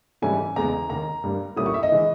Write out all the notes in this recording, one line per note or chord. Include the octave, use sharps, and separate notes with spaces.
G#2 E3 G3 C#4 E4 G#5
E2 C#3 G#3 A#5
D#2 D#3 A#3 A#5
G2 G3 A#3
A#2 G3 A#3 C#4 E4 D#6
C#6
E5
D#5
E3 G#3